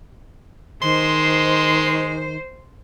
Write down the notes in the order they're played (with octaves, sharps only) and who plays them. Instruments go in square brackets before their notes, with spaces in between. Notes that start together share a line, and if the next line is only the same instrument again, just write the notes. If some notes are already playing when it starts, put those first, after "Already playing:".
[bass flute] D#3 [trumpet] G#3 [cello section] C5 [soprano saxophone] C6